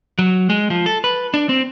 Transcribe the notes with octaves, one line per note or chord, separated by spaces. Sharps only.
F#3
G#3
F3
A4
B4
D4
C4